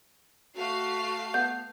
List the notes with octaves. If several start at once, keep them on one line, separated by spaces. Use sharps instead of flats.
A3 F#4 F5 C7
B3 G6